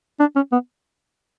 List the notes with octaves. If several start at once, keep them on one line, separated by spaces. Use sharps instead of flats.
D4
C#4
B3